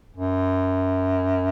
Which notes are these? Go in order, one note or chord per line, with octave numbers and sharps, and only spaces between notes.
F#2